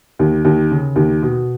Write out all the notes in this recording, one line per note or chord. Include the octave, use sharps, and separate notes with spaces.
D#2
D#2
C#3
D#2
B2